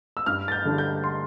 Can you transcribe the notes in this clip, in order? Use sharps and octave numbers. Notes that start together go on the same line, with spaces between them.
E6
G2 F6
A6
G6
D3 G3 D4
G6
C6